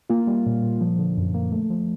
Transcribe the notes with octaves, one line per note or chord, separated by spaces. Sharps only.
A#3 F4
G3
A#2
A#2
F3
D3
F#2
A#3
A3
F3